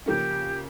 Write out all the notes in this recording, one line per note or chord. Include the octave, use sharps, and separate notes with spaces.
C#3 F3 A#3 C#4 G4